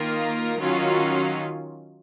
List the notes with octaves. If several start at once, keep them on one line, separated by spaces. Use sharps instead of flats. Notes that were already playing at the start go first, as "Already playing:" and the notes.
Already playing: D#3 A#3 F4 A#4
D#3 F#3 C#4 F4